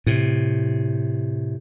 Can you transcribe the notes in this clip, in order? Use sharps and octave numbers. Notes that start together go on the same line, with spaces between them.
A2 C3